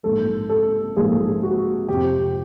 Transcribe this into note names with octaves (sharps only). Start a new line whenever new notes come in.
A#1 G#2 F3 A#3 A4
A4
A#1 G#2 F3 A#3 G#4
F#4
F2 C3 F3 G4